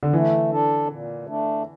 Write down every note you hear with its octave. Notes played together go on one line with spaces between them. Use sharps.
D3
E3 A3
D4 A4
A#2
A3 D4